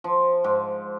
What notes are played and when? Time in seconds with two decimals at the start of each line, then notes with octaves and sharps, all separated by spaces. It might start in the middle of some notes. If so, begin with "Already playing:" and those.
0.04 F3
0.44 G#2